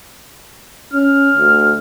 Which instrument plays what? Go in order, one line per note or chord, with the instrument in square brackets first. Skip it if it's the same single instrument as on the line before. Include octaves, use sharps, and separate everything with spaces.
[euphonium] C#4 [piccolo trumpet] F6
[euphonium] D2